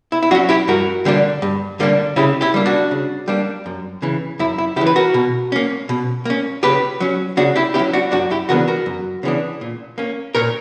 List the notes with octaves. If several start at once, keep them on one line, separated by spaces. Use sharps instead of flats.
E4
E4
F#3 C#4 D4 F#4
E4 G4
G2 F#4 A#4
D3 G3 A#3 D4
G2
D3 G3 A#3 D4
C#3 E4 G4
E4 G4
G3 A#3 D4
D4 F#4
C#3
G3 A#3 D4
F#2
C#3 E3
F#2 E4
E4
C#3 E3 E4 G4
B4
F#4 A#4
B2
A#3 C#4
B2
A#3 C#4
C#3 G4 B4
F#3 C#4
C#3 D4 F#4
E4 G4
C#4 E4 G4
F#3
D4 F#4
F#2 D4 F#4
E4 G4
C#3 E3 B3 D4 F#4 A#4
F#4 A#4
F#2
C#3 E3 B3 D4
A#2
A#3 C#4
A#2 A#4 C#5